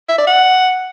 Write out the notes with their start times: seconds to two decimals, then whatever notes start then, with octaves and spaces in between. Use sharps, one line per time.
0.09 E5
0.18 D5
0.27 F#5